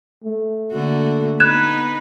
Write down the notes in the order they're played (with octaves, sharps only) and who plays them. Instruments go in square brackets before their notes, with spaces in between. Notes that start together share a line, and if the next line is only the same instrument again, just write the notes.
[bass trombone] A3
[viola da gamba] D3 A#3 F#4
[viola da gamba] B3 D#4 B4 [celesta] F#6 G#6 E7